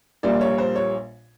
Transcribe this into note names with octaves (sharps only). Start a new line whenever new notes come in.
A#1 A#2 G3 A#3 D5
C#5
C5
C#5